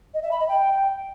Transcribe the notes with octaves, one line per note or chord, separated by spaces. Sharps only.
D#5
E5
B5
D#5
G5